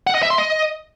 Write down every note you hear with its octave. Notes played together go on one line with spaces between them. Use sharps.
F#5
D#5
E5
C6
D#5